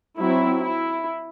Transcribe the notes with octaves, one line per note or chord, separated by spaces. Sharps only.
F#3 C4 E4
E4